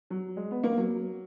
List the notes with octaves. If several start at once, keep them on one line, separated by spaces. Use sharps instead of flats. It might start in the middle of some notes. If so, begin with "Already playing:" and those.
F#3
G#3
B3
A#3
F#3